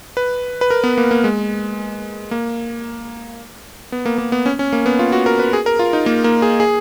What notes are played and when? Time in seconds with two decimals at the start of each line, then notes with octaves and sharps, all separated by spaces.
0.17 B4
0.61 B4
0.70 A#4
0.84 B3
0.98 A#3
1.11 A#3
1.24 G#3
2.31 A#3
3.92 B3
4.06 A#3
4.18 A#3
4.32 B3
4.46 C#4
4.59 C#4
4.73 A#3
4.86 B3
4.99 F4
5.12 F#4
5.26 A#4
5.39 B4
5.53 G#4
5.66 A#4
5.79 F4
5.93 D#4
6.06 A#3
6.24 A#3
6.42 G#4
6.60 G#4